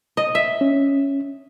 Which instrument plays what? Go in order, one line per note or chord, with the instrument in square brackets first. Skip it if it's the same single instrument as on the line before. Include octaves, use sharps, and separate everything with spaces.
[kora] D#5
E5
[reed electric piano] C#4